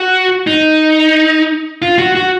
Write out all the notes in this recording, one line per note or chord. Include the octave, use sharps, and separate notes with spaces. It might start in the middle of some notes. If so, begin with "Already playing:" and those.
Already playing: F#4
D#4
F4
F#4
F#4